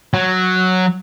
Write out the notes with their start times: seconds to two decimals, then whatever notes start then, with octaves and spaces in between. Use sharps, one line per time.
0.14 F#3